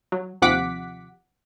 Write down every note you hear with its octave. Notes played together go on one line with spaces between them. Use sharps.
F#3
D#2 C3 F3 F#5 D6 B6